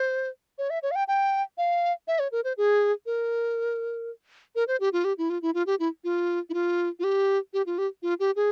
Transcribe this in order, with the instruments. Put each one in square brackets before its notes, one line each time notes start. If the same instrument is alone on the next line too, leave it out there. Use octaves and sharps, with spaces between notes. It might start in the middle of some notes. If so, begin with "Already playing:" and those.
Already playing: [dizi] C5
C#5
E5
C#5
F5
G5
G5
F5
E5
C#5
A#4
C5
G#4
A#4
A#4
C5
G4
F4
G4
E4
F4
E4
F4
G4
E4
F4
E4
F4
F4
G4
G4
F4
G4
F4
G4
G#4